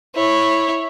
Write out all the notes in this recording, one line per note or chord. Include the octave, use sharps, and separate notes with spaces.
E4 C#5